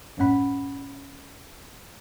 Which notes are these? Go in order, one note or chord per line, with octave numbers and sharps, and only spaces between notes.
G1 F#2 A2 C#4 F#5 B5